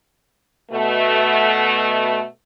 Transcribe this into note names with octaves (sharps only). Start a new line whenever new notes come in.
B2 A3